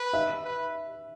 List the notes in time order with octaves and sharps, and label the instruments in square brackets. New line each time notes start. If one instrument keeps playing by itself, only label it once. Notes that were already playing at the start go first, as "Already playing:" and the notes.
Already playing: [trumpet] B4
[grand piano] E5
[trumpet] B4